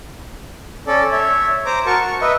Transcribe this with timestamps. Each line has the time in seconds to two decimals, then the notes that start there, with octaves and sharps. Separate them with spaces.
0.87 C#4 A4 D5
1.12 C#5 E5
1.66 C5 A#5 D6
1.86 F#4 A#4 A5 C#6
2.01 C#6
2.22 B4 D#5 E5